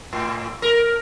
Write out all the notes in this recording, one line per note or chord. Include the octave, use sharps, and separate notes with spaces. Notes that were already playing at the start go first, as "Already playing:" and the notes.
A2
A#4